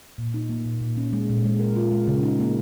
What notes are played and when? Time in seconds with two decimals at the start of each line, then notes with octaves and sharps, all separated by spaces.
0.18 A#2
0.34 D#4
0.49 A#3
0.65 A#2
0.81 A#2
0.97 C#4
1.13 G#3
1.29 A#2
1.44 G#3
1.60 A#4
1.76 F4
1.92 G#3
2.08 C#3
2.23 D#4
2.40 A#3